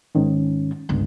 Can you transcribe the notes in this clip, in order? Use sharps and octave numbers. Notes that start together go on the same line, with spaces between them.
G#2 D#3 C#4
G1 C#2